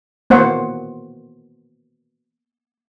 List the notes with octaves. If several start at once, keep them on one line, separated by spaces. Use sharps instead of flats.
A#3 B3 C5 F#5